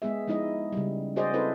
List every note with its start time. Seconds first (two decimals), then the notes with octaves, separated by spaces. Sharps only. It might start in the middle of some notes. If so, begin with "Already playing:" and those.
0.02 G#3 B3 G#4 E5
0.28 F3 G#3 D#4 E4 D#5
0.73 C#3 G3
1.16 F#4 G#4 C5 D5 D#5
1.34 C4 E4 A4 B4 C5